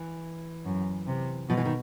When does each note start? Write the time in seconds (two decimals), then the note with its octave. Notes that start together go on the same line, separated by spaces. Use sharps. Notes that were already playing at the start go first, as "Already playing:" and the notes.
Already playing: E3
0.66 F#2
1.08 C3
1.50 B2 F3
1.57 E3
1.65 D#3